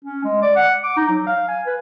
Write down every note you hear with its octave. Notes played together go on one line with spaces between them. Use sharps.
C#4
G#3
D5
F#5
D6
D#4
F#3
F5
G#5
B4